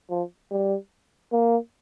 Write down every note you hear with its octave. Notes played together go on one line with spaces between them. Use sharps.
F3
G3
A#3